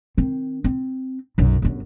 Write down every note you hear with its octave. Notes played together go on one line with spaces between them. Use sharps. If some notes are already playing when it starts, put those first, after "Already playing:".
D#3 C4
C4
B1 F#2
G1 F#2